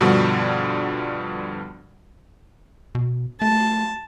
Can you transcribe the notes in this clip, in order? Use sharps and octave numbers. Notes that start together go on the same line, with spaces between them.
G2 B2 D3 F3 G3 F#4
B2
A3 A5